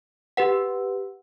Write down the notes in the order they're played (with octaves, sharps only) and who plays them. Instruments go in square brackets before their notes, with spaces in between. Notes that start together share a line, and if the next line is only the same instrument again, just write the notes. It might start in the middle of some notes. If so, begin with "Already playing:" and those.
[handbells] G4 B4 F#5